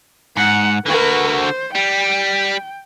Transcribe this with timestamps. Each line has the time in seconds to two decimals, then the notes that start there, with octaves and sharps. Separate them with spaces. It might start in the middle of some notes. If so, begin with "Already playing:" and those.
0.37 G#2 F#5
0.86 D3 F#4 A#4 B4
1.37 C5
1.75 G3 G5